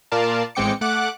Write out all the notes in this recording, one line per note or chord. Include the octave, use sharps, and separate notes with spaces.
A#2 F4 A#4 D5 F5 A5
A1 G#3 C4 G5 D6 C#7
A3 F#5 D6 F#6